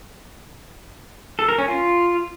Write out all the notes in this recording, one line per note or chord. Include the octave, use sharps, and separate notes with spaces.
A4
A#4
C#4
F4